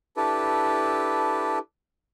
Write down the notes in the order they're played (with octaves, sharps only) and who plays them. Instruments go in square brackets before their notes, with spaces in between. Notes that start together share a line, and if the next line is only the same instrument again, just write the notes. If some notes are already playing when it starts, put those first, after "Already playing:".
[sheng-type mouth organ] D4 E4 G4 A4 B4